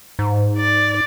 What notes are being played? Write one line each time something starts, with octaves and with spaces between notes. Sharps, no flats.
G#2
D5